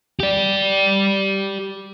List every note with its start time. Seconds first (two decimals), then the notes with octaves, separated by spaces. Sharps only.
0.20 G4 D5